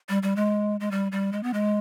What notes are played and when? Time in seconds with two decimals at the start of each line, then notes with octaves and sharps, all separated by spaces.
0.09 G3
0.23 G3
0.36 G#3
0.80 G#3
0.91 G3
1.12 G3
1.32 G#3
1.43 B3
1.53 G#3